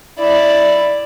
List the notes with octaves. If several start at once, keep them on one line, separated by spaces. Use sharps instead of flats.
E4 D5